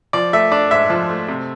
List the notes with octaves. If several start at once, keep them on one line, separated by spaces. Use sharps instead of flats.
F3 D5
A3 E5
D4 D5
G#2 E5
F3
A3
C3